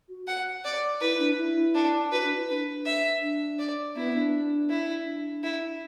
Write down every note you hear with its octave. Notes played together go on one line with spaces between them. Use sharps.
F#4
F#5
D5
E4 B4
D4
E4
D4
F#4 B4
D4
E4
D4 B4
E5
D4
D5
B3 E4
D4
E4
D4
E4